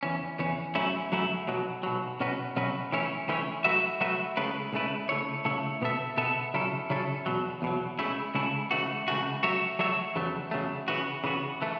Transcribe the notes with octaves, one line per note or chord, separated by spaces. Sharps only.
E2 E3 C#4
E2 E3 C#4
F#2 F#3 A3 C#4 E4
F#2 F#3 A3 C#4 E4
B1 B2 F#3
B1 B2 F#3
B2 F#3 C#4 F#4 B4
B2 F#3 C#4 F#4 B4
E3 A3 C#4 E4 C#5
E3 A3 C#4 E4 C#5
F#3 A3 F#4 B4 E5
F#3 A3 F#4 B4 E5
C#2 C#3 A3 E4 B4
C#2 C#3 A3 E4 B4
C#3 A3 E4 C#5
C#3 A3 E4 C#5
B2 B3 A4 E5
B2 B3 A4 E5
C#3 F#3 C#4 E4 A4
C#3 F#3 C#4 E4 A4
E2 B2 F#3
E2 B2 F#3
C#2 C#3 A3 E4
C#2 C#3 A3 E4
C#2 C#3 E3 A3 F#4
C#2 C#3 E3 A3 F#4
F#3 A3 F#4 C#5 E5
F#3 A3 F#4 C#5 E5
E2 C#3 F#3 A3
E2 C#3 F#3 A3
C#3 E3 B3 F#4
C#3 E3 B3 F#4
E3 A3